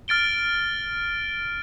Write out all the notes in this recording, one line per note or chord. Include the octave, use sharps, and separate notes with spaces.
F6 A6 D7 G7